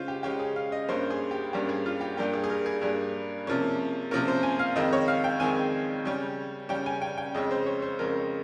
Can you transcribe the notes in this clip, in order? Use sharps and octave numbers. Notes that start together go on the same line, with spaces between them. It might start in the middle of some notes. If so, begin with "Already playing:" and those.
Already playing: C#3 G#3 C#4 F4 C5
G4
C#3 G#3 C#4 G4
G#4
F5
D#5
G2 G3 A#3 C#4 C5
G#4
G4
G2 G3 A#3 C#4 G4
G#4
F4
G4
G2 G3 A#3 G4
G#4
G#4
A#4
G#4
G2 G3 A#3 G#4
C3 F3 A#3 C#4
C3 F3 A#3 C#4 A#4
C5
G#5
F5
F2 D#3 G#3 C4 D#5
C#5
F5
G5
F2 D#3 G#3 C4 G#5
C#3 G3 C#4
C#3 G3 C#4 G5
G#5
G5
G5
F2 C#3 G#3 C#4 D#5
C5
C#5
C5
F2 C#3 G#3 C#4 A#4